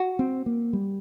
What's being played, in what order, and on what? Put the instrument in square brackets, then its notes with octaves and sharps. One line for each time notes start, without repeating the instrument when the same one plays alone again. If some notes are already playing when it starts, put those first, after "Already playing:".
Already playing: [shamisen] F#4
[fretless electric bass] C4
A#3
G3